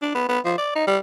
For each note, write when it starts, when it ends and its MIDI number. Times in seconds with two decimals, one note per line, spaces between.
0.02 0.11 62
0.15 0.24 59
0.29 0.39 59
0.45 0.54 53
0.58 0.72 74
0.75 0.87 63
0.87 0.98 55